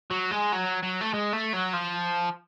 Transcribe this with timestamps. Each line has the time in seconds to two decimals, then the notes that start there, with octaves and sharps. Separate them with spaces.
0.11 F#3
0.31 G#3
0.52 F#3
0.83 F#3
1.01 A3
1.14 G#3
1.33 A3
1.53 F#3
1.74 F3